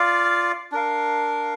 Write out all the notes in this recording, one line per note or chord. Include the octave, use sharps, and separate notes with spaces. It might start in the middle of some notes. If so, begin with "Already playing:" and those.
Already playing: F4 D5 F5
D4 A#4 F5